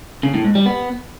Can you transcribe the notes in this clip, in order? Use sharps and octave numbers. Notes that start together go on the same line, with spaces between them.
C#3
A2
G#2
G3
B3